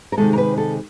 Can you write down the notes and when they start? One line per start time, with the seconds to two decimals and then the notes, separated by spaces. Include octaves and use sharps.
0.12 A#4
0.17 C3 D#3 G#3 A4
0.33 A#4
0.38 B4
0.57 A4